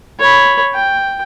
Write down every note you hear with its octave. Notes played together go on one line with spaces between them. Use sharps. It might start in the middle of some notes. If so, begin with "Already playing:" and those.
C#5 B5
G5